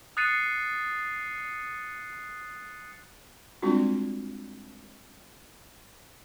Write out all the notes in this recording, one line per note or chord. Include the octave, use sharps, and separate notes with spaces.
D#6 F#6 A6 C7 C#7 D#7
G3 G#3 C4 D4 F4 F#4